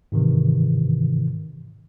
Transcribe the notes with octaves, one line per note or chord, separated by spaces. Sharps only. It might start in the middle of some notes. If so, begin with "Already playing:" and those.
G#2 C3 D#3 E3